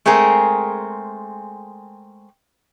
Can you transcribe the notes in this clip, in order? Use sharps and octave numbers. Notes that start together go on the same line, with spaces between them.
G#3 A3 C4 G#4 A#4